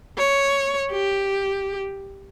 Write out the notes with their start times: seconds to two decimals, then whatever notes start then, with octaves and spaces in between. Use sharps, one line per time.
0.18 C#5
0.92 G4